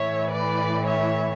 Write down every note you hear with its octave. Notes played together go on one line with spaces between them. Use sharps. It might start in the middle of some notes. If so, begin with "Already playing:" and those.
Already playing: A2 E3 C#5 E5
B4 D5
C#5 E5